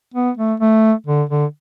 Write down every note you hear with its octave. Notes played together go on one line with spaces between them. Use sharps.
B3
A3
A3
D3
D3